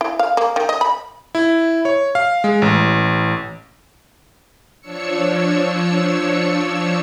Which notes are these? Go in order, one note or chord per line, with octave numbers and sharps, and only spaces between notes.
E4
F5
A#3
D#3
D#5
B5
E4
C#5
F5
G#3
A1
F3 D4 C#5 E6 C#7